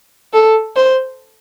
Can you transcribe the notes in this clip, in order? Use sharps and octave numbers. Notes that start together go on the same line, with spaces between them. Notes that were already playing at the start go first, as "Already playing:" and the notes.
A4
C5